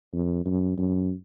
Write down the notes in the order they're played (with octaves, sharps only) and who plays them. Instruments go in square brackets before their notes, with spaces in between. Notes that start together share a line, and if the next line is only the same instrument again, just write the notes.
[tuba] F2
F#2
F#2